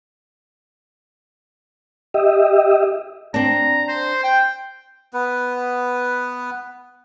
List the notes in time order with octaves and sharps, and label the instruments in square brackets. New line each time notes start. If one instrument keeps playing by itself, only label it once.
[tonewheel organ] G4 D#5 E5
[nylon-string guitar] C4 D4 [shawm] A#5
[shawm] C5
G5
[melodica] B3 B4